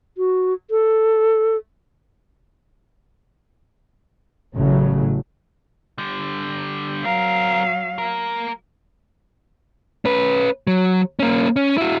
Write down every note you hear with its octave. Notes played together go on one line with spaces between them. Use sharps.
F#4
A4
A1 A2 C#3 F#3
D3 G3
F#3 C4 A#4 F5
A#3 A#4
C#4 B4
F#3
A#3 C#4
C#4
E4 F#4